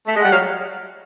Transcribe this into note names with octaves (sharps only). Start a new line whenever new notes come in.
A3
G#3
G3 F#5
F#3 F5